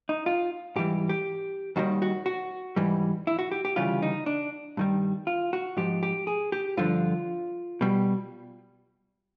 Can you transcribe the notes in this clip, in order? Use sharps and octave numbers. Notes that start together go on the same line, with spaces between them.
D#4
F4
G#2 E3 G3 G4
G4
D#2 D#3 G3 F#4
F#4
F#4
G#2 E3 G3
E4
F#4
G4
G4
D2 C#3 E3 G3 F4
D#4
D4
G2 D#3 G3
F4
F#4
G#2 F3 G4
G4
G#4
G4
G2 D3 F3 F4
B2 G3